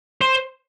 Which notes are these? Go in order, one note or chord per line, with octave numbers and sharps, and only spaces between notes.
C5